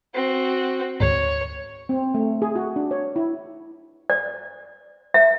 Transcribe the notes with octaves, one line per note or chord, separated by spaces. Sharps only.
C4 F#4
D2 G#2 C#5
C4
A3
G#4
F#4
D4
C#5
E4
D5
E5